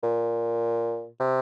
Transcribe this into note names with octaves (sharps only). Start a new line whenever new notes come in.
A#2
C3